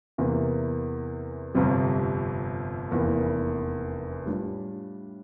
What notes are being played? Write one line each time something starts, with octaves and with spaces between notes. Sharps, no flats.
E2 C3 E3 A#3
G1 F2 C3 G3
F1 E2 E3 A#3 E4
A2 G3 D4 F4